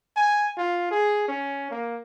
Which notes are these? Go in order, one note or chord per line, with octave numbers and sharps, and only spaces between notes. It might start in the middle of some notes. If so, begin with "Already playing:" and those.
G#5
F4
G#4
C#4
A#3